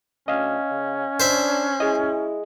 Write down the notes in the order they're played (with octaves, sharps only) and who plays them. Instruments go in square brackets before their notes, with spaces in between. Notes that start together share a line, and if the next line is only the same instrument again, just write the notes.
[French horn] D2 [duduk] C#4 [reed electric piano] D#5 F5
[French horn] C#3
[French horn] D4 [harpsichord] C5 E5
[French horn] E4 [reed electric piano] G#4 D#5